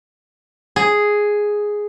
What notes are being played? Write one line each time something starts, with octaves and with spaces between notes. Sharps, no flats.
G#4